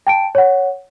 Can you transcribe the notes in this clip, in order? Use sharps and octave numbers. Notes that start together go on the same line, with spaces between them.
G5 A5 D7
C#5 F#5